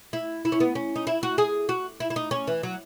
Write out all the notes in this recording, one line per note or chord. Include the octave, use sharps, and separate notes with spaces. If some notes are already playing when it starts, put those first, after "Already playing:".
E4
E4
C#4
B3
C#4
D#4
E4
F#4
G#4
F#4
E4
E4
D#4
C#4
E3
F#3